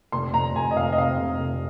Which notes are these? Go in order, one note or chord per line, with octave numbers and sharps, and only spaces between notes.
F1 C6
F1 A#5
F1 G#5
D#5
F1 F5
D#5
C3 F5
F1
F1